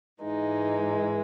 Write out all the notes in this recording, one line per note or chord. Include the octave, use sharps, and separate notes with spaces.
G#2 E3 G#3 D#4